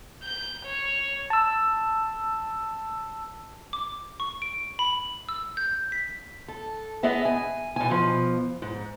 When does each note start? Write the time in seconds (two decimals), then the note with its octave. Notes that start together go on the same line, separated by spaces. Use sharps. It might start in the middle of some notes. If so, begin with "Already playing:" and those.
0.23 G6
0.66 C#5
1.30 A5 E6
3.73 D6
4.20 C#6
4.42 D7
4.79 B5
5.29 E6
5.57 G6
5.92 B6
6.48 A4
7.03 B3 G#4 D#5 E5
7.25 G#5
7.76 B2 G#5
7.90 B2 F3
8.62 G#2